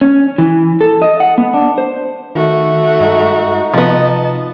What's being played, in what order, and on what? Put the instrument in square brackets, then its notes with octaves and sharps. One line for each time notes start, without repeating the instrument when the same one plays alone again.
[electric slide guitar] C#4
E3
A4
D#5
F#5
B3
D4
C5
[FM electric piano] D#3 D#4 [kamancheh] A3 F#4
[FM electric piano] G2 G#3 [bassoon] D#4
[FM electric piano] C3 [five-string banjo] F3 B3 [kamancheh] D#5 A5